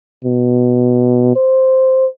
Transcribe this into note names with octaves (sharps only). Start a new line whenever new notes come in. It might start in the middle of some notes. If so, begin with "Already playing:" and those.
B2
C5